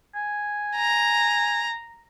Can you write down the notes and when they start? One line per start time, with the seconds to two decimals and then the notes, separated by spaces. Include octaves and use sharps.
0.15 G#5
0.76 A#5